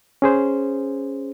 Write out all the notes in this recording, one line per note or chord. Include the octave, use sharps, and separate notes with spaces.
C#4 G#4 C5